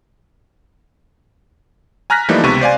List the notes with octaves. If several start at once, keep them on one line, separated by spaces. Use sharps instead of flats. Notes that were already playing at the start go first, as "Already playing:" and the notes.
G#5 A#5 F6 F#6 A#6 B6
E3 F3 G3 A3 A#3 D#4
C#2 C3 B3 C#6 D#7
C5 D5 F5 G#5